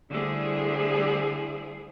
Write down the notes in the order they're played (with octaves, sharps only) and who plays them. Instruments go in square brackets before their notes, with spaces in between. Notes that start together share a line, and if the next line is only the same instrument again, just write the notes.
[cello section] D3 G3 A3 E4 G#4 C5